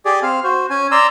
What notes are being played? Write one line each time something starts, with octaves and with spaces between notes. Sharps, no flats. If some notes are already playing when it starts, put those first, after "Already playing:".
G4 G#4 D5
C4 F5
F#4 C5
C#4 G#5
D5 A#5 C6 E6